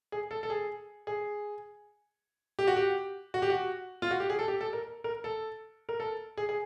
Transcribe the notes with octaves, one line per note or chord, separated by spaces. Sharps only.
G#4
A4
A4
G#4
G#4
G4
F#4
G4
F#4
G4
F#4
F4
F#4
G4
G#4
A4
G4
A4
A#4
A#4
A4
A#4
A4
G#4
G#4